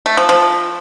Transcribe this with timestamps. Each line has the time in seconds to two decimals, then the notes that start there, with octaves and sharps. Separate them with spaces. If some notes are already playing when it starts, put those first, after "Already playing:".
0.06 A3
0.17 F3
0.29 F3